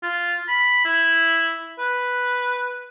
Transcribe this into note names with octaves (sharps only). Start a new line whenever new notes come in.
F4
B5
E4
B4